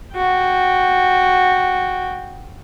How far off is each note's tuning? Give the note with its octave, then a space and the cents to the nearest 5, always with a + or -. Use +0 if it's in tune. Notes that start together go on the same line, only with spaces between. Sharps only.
F#4 -5 G5 +0